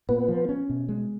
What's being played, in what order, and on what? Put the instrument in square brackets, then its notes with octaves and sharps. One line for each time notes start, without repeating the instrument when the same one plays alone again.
[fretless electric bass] A#2 [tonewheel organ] B3
[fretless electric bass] F3
C#4
B2
G#3